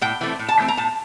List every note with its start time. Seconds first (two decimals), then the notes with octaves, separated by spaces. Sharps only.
0.01 A2 G5
0.21 E3 A3 C4
0.39 A2
0.49 A5
0.58 E3 A3 C4
0.68 A#5
0.77 A2 A5